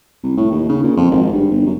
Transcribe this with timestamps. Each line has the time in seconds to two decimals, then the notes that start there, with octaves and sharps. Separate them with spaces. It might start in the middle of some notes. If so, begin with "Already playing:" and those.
0.23 C2
0.37 A2
0.51 D#2
0.69 C#3
0.83 A#2
0.97 F2
1.11 G#1
1.33 G2
1.51 G1
1.66 F#2